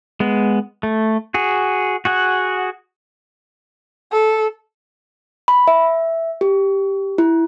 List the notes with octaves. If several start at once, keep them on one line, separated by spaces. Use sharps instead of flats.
G#3 B3
A3
F#4 G#4
F#4 G#4 F#5
A4
B5
E5
G4
E4